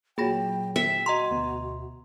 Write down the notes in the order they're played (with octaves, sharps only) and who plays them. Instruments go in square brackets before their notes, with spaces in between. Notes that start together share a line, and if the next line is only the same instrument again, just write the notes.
[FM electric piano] A#2 F#3 [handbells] G#4 B5 A#6 [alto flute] G5
[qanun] E5 [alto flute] G5
[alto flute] F#4 [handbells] D#5 A#5 C6
[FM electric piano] D2 B2